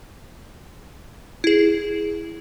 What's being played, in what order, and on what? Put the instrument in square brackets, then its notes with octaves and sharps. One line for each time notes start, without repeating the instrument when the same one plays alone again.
[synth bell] E4 G#4